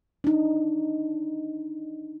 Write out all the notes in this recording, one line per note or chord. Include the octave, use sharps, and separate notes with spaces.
D4 D#4